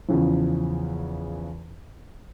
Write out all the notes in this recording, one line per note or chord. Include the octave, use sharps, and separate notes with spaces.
E2 C#3 E3 F3